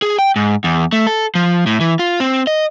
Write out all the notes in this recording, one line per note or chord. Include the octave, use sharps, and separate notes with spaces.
G#4
G5
G#2
E2
A3
A4
F3
A2
E3
F4
C4
D#5